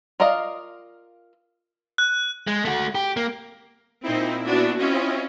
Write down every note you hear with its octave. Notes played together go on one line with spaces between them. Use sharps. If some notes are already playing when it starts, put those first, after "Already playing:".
F4 A#4 D5 D#5 F5
F#6
G#3
A3 F#4
G4
A#3
A#2 C4 D#4 E4
B3 D4 F#4
C4 C#4 E4 F4 D#5